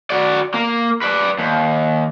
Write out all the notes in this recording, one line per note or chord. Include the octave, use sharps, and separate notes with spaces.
F#4 D5
A#3
B4 D5
D#2